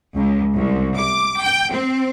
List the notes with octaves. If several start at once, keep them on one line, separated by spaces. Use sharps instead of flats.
C#2
C2
D6
G5
C4